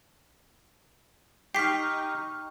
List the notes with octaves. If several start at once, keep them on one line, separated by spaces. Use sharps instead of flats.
D#4 G4 G5 C#6 F6 B6 C7